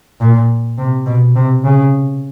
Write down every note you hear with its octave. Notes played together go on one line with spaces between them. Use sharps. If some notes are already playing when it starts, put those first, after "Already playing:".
A#2
C3
B2
C3
C#3